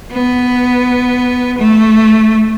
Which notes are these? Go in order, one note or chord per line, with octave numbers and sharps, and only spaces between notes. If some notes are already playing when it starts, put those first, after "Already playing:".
B3
A3